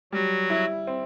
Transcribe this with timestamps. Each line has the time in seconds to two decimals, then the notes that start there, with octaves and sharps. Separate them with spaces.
0.12 F#3 G3 F#4
0.50 E4
0.87 C4